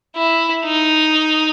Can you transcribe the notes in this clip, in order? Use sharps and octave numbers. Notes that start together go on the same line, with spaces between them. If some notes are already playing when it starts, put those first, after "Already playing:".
E4
D#4